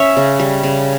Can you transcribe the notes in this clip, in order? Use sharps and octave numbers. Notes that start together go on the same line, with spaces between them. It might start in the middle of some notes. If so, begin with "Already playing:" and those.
Already playing: C#4 C#5 E5
C#3
G3
C#3